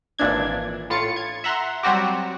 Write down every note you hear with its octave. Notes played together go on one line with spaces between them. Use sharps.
G#1 A#2 E3 D4 G#6
A2 F4 A6 C#7
G#6
E5 F#5 A#5 C6
F#3 G3 C4 F#4 G4